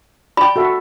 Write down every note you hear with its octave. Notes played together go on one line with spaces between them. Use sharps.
D5 G5 B5
F#4 A4 E5